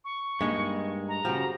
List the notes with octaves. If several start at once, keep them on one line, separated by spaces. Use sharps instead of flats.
C#6
G2 G#3 A#3 D#4
A#5
C#3 F3 F#4 G4